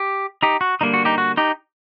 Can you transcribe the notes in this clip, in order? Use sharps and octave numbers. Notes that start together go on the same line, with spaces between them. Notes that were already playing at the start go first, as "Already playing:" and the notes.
Already playing: G4
D#4 G4
F#4
D3 G3 A#3 D4 D#4
F#4
D#4 G4
F#4
D#4 G4